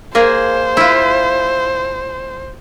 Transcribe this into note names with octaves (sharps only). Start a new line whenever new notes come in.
A#3 G#4 C5
E4 F4